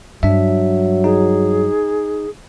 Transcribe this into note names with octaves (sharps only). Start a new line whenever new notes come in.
G2 F#3 D4 E5
D#4 G#4